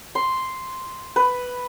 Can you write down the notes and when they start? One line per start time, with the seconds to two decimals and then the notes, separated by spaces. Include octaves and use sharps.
0.15 C6
1.16 B4